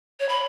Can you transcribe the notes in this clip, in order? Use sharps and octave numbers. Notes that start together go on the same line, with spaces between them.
C#5
B5